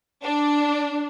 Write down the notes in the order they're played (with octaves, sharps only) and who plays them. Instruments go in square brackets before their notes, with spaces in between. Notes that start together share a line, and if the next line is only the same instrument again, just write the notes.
[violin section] D4